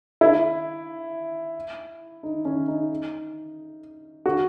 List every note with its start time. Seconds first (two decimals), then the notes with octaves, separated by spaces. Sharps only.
0.21 E4
2.23 D#4
2.45 C#4
2.68 D#4
4.26 F#4